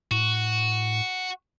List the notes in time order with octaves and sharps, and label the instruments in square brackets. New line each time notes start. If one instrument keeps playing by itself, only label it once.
[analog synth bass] A2 [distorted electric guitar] F#4